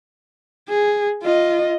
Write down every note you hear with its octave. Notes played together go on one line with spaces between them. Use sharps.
G#4
F4 D#5